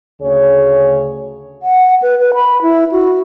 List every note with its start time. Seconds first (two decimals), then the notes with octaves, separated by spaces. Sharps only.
0.22 D2 C#3 G#4 C#5
1.63 F#5
2.02 B4
2.19 B4
2.34 B5
2.62 E4
2.92 F#4